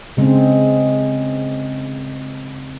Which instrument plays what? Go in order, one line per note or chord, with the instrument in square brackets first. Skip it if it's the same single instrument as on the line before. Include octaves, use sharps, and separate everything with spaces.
[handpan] C#3 G#3 C4